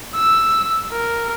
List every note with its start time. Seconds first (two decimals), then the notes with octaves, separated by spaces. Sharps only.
0.16 E6
0.92 A#4